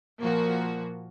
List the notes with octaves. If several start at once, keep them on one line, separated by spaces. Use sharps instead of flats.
A#2 F3 A#3 F#4